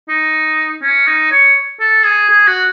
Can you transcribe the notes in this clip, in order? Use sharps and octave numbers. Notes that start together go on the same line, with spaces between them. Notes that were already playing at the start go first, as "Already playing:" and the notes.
D#4
C#4
D#4
C#5
A4
G#4
G#4
F#4